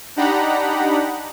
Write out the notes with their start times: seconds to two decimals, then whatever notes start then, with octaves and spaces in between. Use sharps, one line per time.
0.16 D4 D#4 G4 F#5 A#5 B5